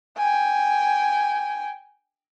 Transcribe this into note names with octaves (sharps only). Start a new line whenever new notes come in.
G5 G#5